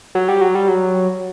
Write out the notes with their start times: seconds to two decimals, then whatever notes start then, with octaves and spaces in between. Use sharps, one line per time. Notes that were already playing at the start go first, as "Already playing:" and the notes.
0.15 F#3
0.28 G3
0.41 F#3
0.55 G3
0.68 F#3